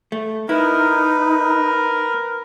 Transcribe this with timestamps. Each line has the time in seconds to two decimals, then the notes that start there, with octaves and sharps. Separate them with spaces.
0.12 A3
0.49 D#4 E4 A#4 B4
1.29 A#4